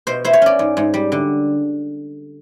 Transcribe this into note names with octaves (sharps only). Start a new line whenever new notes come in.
B2 C5
E4 C5
C#5
C#4 D5
G#2
G#2
G3
D3